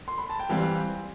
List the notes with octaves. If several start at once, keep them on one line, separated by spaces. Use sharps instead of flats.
C6
B5
A5
G5
E3 G3 C4 F5